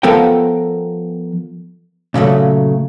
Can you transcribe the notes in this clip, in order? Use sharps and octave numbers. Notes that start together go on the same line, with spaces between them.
F3 B3 A4 A#4 G5
A#2 C#3 F#3 A3